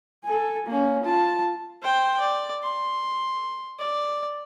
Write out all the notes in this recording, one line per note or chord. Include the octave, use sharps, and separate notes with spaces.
A4 G#5
A#3 C#4
F4 A5
C5 G5
D5
C6
D5